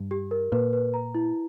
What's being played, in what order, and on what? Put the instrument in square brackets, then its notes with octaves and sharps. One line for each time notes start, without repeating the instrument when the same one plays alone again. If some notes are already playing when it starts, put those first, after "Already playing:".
Already playing: [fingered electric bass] G2
[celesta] G4
A#4
[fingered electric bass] A#2 [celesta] B4
[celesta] B4
A#5
E4